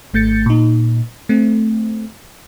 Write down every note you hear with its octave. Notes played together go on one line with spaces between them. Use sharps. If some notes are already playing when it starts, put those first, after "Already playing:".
G#1 A3 G6 A6 C#7
A#2 D#4
A3 C4